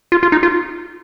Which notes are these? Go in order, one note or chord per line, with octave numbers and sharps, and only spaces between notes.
F4
F4
D#4
F4